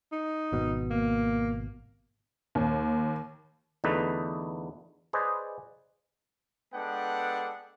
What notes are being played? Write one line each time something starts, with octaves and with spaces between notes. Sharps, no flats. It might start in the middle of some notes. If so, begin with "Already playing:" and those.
D#4
G#1 B2
A#3
D#2
E2 D3 A3 D#4 B4
G#4 B4 C5 D5 D#5
G#3 B3 D4 A4 F#5 G5